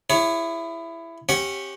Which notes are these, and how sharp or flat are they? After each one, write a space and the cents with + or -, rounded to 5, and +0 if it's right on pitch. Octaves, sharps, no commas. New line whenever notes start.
E4 +15 G#4 -30 C#5 +0
C#4 -20 G4 +0 F#5 +0